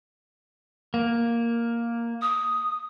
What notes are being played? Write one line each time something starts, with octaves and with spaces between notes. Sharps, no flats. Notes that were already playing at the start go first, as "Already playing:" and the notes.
A#3
D#6